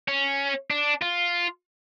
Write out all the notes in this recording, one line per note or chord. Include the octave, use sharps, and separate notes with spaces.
C#4
D4
F4